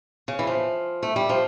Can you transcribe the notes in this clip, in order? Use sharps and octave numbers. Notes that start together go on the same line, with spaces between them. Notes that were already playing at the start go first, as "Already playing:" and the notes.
C#3
E3
F3
A3
G3
F3